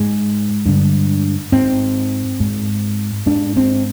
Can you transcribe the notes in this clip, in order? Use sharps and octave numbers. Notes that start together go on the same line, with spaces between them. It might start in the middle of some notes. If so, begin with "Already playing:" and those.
Already playing: G#2 G#3
G2 D3
G#2 C4
G#2
G#2 D4
C4